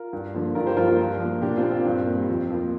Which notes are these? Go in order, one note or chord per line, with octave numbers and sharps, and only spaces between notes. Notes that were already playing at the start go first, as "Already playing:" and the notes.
Already playing: F4 A#4
G2
D3 F3 A#3
G2 F4 A#4
G4 C5
F3 A#3 F4 A#4
F4 A#4
G2
F3 A#3
A#2 D4 G4
C4 F4
A#3
C4 F4
G2
G3 A#3
F2 C4
F3 A#3